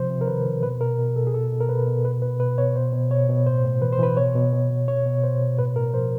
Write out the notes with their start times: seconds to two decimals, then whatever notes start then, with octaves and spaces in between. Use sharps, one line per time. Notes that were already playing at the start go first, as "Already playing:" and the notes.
Already playing: C3 F3 C5
0.10 C3
0.21 A#4
0.28 D#3 B4
0.46 D#3
0.63 B2 B4
0.81 B2 A#4
0.99 B2
1.16 B2 A4
1.27 G#4
1.34 B2 A4
1.52 B2
1.61 A#4
1.69 B2 B4
1.87 B2
2.05 B2 B4
2.22 B2 B4
2.39 B2 B4
2.58 B2 C#5
2.76 B2 C5
2.93 B2
3.10 B2 C#5
3.29 B2
3.46 A2 C5
3.65 A2
3.81 E3 B4
3.92 C5
3.99 E3 B4
4.17 B2 C#5
4.35 B2
4.53 B2
4.70 B2
4.88 B2 C#5
5.06 B2
5.23 B2 C5
5.41 B2
5.59 A2 B4
5.76 A2 A#4
5.93 F3 C5